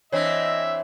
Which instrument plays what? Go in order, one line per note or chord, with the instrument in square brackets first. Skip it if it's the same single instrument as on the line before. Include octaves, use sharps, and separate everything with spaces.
[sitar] E3 C4 D4 [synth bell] C#5 [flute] D#5 [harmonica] E5